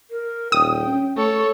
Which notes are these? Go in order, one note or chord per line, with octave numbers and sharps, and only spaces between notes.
A#4
D#1 G5 D#6
C#4
A3 A4 C#5 C#6